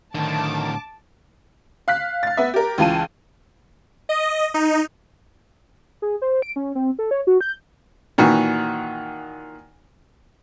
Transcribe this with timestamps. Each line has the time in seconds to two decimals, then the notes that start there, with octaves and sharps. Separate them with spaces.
0.15 A2 D3 D#3 A5 D6
1.88 F5 F#6 B6
2.23 F5 A6
2.37 B3 E5
2.54 G4 A#4
2.78 C#2 E3 F4 A5 D#7
4.09 D#5
4.54 D#4
6.02 G#4
6.22 C5
6.42 D7
6.56 C#4
6.75 C4
6.99 A4
7.11 C#5
7.27 F#4
7.41 G6
8.18 A#2 D#3 E3 F#4